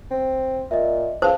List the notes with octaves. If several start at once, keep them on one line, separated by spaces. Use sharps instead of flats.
C4
A#2 D#5 E5
C#2 C5 F5 A5